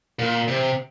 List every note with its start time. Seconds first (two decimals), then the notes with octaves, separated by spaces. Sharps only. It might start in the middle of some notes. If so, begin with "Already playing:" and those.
0.19 A#2
0.48 C3